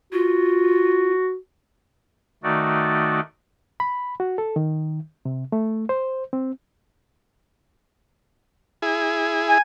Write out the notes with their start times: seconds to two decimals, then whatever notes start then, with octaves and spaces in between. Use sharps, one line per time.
0.13 F4 F#4
2.43 D#3 A3 D#4 F#4 D5
3.80 B5
4.20 F#4
4.38 A4
4.56 D#3
5.25 C3
5.52 A3
5.89 C5
6.33 C4
8.82 E4 G#4
9.49 G#5